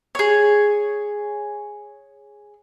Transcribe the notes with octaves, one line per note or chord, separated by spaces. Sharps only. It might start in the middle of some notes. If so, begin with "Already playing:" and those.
G#4 C#5